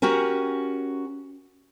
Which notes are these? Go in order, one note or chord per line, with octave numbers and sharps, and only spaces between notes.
C#4 F#4 G4 A#4 G#5